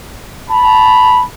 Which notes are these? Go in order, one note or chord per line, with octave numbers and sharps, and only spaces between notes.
A5 B5